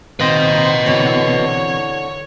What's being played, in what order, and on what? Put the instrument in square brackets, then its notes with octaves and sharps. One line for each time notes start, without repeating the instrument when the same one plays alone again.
[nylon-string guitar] A#2 C4 [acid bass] D#3 [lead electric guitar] B4 D#5 [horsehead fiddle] C5
[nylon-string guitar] B2 E3 C4 [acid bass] D3 [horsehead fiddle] C#5